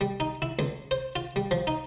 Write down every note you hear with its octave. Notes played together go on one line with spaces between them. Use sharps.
G3
D#4
E4
C#2
C5
F4
G3
F3
D#4